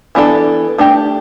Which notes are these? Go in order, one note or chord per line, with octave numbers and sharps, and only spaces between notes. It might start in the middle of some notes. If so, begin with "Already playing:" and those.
E3 B3 D4 A4
A3 D4 G4